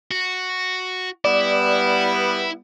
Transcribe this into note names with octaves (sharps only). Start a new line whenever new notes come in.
F#4
G3 B3 E4 D5